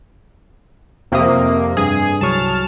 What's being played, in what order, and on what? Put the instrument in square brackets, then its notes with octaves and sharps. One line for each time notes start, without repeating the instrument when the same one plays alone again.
[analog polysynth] F2 C3 A#3 [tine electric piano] C4 E5 D#6
[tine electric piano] G2 [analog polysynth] G#4
[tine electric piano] C2 F#3 C#6 [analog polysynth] A5 F6